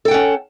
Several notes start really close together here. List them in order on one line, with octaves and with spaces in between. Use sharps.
A4 G5 F#5 C#4